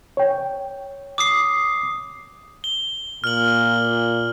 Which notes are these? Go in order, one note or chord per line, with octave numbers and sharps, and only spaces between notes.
C#5 G5
D6 D#6 C7
G7
A#2 F6 F#7